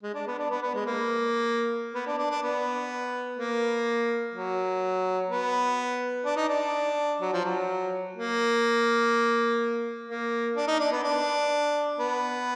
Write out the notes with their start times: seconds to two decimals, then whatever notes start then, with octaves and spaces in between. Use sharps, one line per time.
0.03 G#3
0.14 D4
0.27 B3
0.38 D4
0.51 B3
0.62 B3
0.75 G#3
0.86 A#3
1.94 B3
2.06 D4
2.18 D4
2.30 D4
2.42 B3
3.38 A#3
4.33 F#3
5.29 B3
6.25 D4
6.37 D#4
6.48 D4
7.21 F#3
7.33 F3
7.45 F#3
8.16 A#3
10.08 A#3
10.56 D4
10.68 D#4
10.79 D4
10.92 B3
11.03 D4
11.99 B3